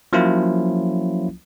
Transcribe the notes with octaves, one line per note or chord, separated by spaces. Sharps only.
F3 F#3 A#3 C#4 E4 F4